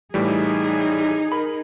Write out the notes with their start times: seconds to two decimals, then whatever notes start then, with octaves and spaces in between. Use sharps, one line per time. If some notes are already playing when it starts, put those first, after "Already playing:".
0.14 A2 E3 G3 D#4 G#4
1.32 A#4 B5